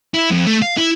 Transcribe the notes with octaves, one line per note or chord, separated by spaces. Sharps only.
E4
F2
A3
F5
E4